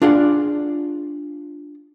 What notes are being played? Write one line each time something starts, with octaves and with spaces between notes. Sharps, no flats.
D4 F4 G#4 D5 F#5